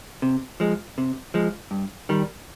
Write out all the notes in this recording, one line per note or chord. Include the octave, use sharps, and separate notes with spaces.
C3
F3 G#3
C3
F3 G#3
G2
D#3 G3